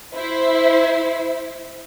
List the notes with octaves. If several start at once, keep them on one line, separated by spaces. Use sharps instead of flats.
E4 C5